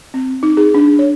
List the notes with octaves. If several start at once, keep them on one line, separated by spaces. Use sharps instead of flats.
C4
D#4
G#4
D4
C#5